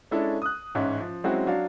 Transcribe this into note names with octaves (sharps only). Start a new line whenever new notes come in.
G#3 C#4 D4 E4 A4 C#5
D#6 F#6
A1 G#2 C#4 E5
F3
F#3 G#3 C4 C#4 E4 F#4
F#3 D4 F5